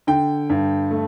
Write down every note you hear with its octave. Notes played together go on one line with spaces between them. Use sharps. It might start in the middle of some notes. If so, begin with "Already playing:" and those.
D3 G5
G2
A3